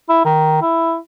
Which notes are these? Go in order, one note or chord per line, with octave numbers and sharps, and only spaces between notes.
E4
D#3
E4